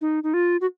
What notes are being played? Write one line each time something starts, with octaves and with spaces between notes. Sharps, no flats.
D#4
D#4
F4
F#4